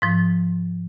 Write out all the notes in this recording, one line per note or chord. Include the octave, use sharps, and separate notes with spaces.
G#2 F3